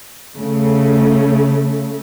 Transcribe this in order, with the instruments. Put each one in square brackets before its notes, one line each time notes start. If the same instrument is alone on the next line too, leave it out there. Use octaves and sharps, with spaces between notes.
[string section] C#3 A3